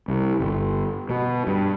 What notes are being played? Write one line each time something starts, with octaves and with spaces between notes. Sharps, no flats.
C2
G1
B2
G2